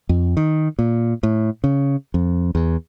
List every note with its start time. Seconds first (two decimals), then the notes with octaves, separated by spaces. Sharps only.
0.09 F2
0.37 D#3
0.79 A#2
1.23 A2
1.64 C#3
2.14 F2
2.55 E2